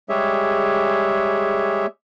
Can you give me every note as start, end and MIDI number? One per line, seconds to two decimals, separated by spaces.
0.09 1.86 55
0.09 1.86 56
0.09 1.86 67
0.09 1.86 68
0.09 1.86 73
0.09 1.86 76